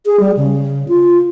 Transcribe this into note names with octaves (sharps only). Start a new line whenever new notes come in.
G#4
G3
C#3
F4